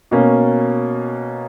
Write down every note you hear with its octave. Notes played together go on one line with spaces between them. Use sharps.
B2 A#3 C#4